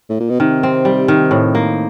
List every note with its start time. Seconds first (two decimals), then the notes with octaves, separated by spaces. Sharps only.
0.10 A2
0.20 A#2
0.30 B2
0.40 C3 D#3
0.63 C4
0.85 G3
1.08 D#3
1.31 A2
1.55 A#3